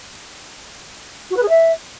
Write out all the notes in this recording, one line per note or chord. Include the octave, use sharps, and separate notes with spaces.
F#4
B4
G#4
E5